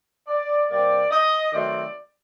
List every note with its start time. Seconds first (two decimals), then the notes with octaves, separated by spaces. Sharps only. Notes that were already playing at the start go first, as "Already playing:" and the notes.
0.28 D5
0.69 C3 G3 A#3 D5
1.11 D#5
1.53 D#3 F#3 A3 C4 D5